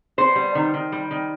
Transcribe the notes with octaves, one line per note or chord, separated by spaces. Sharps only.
B3 C5
G3
D#3
D#3
G3
D#3